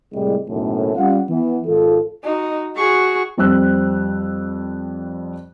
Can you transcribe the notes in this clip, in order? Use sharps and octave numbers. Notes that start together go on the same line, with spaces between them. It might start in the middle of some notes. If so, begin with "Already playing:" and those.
C2 A2 G3 G#3
F#1 B1 F#2 A2
G3 C#4 F4 F5 F#5
E3 B3
G#1 F4 A4
D#4 F#4
F#4 G#4 C#6
F2 G3 C5 E6 F#6